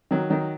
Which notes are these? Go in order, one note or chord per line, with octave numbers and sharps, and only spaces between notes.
D#3 F#3
D#3 F#3